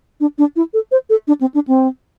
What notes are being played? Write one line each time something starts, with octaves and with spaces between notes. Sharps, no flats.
D4
D4
E4
A4
C5
A4
D4
C4
D4
C4